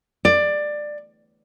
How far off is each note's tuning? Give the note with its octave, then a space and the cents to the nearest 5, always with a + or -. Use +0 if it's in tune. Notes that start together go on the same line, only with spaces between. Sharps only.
D5 +15